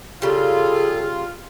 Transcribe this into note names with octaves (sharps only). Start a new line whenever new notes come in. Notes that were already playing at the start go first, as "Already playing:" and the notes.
C#3 G3 F4 G#4 A4